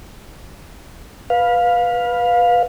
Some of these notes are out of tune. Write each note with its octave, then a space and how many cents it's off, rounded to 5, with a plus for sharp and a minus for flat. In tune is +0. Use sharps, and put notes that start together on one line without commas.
B4 -10 F5 +15